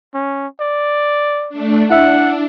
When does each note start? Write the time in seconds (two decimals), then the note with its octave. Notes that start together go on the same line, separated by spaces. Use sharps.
0.14 C#4
0.60 D5
1.49 A3 D4
1.90 D4 E4 E5 F#5